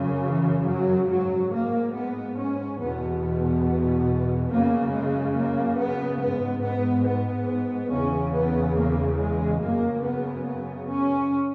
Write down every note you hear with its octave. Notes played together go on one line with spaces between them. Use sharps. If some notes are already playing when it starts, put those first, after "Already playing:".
Already playing: F#2 C#3
E3
F#3
G#2 F#3
A#3
B3
C#4
E2 B2 B3
B3
F#2 C#3 A#3
G#3
A#3
B3
G#2 B3
B3
B3
E2 C#3 C#4
B3
A#3
G#3
F#2 C#3 A#3
B3
B3
C#4